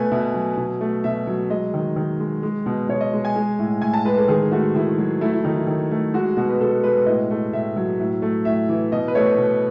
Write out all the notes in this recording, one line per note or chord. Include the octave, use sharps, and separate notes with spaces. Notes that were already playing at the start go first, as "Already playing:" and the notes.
Already playing: B2 A3 B4 G#5
B2 E5
F#3
B2
A3
B2 E5
F#3
G#3 D#5
D#3
D#3
G#3
G#3
B2
B2 C#5
D#5
G#3
G#5
G#3
A2
A2 G#5
A5
G#3 B4
A4
D#3 G#4
A3 F#4
D#3 E4
F#3
A3 E4
E4
D#3 D#4
E4
D#3
A3
G#3 F#4
B2 F#4
B4
B2 A4
G#3 B4
A2 D#5
A3
A2 E5
F#3
A2
A3
A2 E5
E3
B2 D#5
B4
A3 C#5
B2